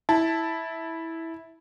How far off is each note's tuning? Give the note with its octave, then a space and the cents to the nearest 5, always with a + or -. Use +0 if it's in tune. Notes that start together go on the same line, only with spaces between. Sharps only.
E4 -10 A5 +0